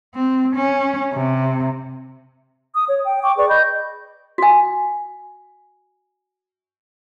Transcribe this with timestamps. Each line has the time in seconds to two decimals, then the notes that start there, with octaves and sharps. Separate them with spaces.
0.14 C4
0.55 C#4
1.13 C3
2.75 D#6
2.87 C#5
3.05 G5
3.23 G5 C#6 D6
3.37 G#4 B4 D5 C#6
3.49 D#5 B5 G6
4.38 F#4 G#5